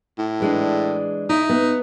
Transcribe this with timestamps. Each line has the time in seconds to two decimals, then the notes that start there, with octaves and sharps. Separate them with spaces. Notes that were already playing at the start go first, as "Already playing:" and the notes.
0.18 A2
0.40 E3 G#3 D4
1.29 D#4 E4
1.49 B3